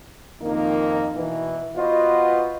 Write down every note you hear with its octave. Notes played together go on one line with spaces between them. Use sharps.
F2 D#3 A#3 D#4
B2 E3
B3 F4 F#4 B4 C5 D#5